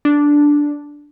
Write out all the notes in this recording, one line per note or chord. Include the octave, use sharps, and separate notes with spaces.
D4